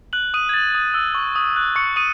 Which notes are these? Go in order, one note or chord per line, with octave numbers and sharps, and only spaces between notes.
F#6 F#7
D#6 D#7
G#6
A6
D#6
E6
C#6
D#6
F#6
C#6 C#7
D#6 D#7